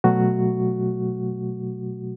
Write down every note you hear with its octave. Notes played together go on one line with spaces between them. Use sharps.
B2 F#3 A3 F#4